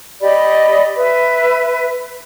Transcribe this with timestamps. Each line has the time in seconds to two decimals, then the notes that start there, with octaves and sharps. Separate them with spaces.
0.21 G4 D5 D#5 B5
0.96 B4 E5